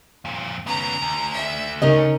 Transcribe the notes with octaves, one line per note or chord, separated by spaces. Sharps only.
F2 A#2
C#3 B3 A#5
D2
E5
C#3 C#4 D#4 A#4 D#5